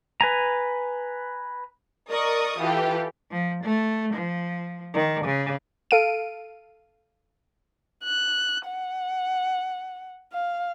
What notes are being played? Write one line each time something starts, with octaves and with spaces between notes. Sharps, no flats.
B4 G#5 A#5
A#4 D5 D#5 C#6 D#6
E3 F4 G4 A4
F3
A3
F3
D#3
C#3
A4 F5 D7 D#7
F#6
F#5
F5